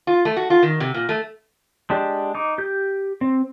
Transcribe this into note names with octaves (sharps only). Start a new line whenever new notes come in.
F4
A3
F#4
F4
D#3
C3
A#2
A3
G#3 D4 G4
D#4 D6
G4 G6
C4